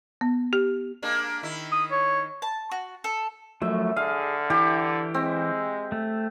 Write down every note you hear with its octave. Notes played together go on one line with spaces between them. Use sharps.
B3
G4
G#3 A#3 D4
D#3 E4
D#6
C#5
A5
F#4
A4
F#2 F3 F#3 A3 E5
D3 G#4 F5
E3 E4 G4
G#3 C4
A3